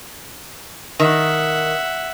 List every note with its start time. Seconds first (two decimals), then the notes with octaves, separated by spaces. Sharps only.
1.00 D#3 E5 F#5